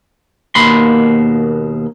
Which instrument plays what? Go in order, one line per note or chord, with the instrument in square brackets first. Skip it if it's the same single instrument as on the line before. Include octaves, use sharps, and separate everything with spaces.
[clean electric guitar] D#2 B2 A#3 B5 C6